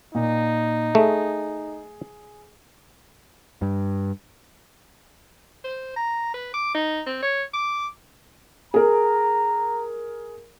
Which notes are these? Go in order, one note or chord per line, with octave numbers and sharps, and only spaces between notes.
A#2 D#4
A3 G#4
G2
C5
A#5
B4
D6
D#4
C4
C#5
D6
G#4 A#4 A#5